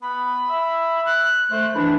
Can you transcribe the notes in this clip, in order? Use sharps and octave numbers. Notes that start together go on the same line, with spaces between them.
B3 B5
E5
F#6
A3 C5
E3 D4 B5